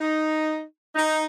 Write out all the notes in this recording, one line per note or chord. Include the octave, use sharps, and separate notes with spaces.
D#4
D#4